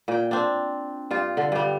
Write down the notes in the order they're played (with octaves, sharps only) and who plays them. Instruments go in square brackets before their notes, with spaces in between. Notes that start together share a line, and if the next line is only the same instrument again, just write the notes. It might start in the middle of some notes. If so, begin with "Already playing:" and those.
[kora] A#2 G5
C4 D4
G2 F4
D3
G2 G3